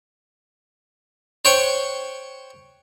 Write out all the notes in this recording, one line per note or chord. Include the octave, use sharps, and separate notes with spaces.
C5 C#5 F#5 G5 C#6